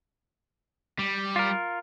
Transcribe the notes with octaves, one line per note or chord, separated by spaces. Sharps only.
G3
F4 A#4